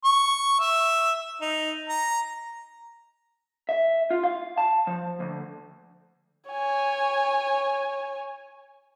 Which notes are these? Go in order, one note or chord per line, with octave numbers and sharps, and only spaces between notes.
C#6
E5
D#4
A#5
E5
F4
F5
A5
F3
D2
C#5 G#5